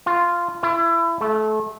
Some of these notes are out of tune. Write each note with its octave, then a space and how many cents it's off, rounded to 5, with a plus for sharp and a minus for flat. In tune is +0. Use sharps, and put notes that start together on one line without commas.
F4 -10
E4 +30
A3 -30